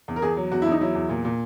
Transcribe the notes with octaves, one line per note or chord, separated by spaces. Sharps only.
E2
A#4
E2 G#4
F#3
E2 F#4
E2 E4
D#4
F#3 E4
E2
A#2
A#2